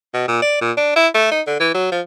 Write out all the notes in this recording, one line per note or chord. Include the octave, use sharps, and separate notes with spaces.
B2
A#2
D5
A#2
D4
E4
A3
D#4
D3
E3
F#3
F3